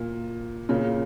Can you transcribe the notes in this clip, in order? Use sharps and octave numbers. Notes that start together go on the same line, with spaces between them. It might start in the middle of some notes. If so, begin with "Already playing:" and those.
Already playing: A#2
A#2 C#3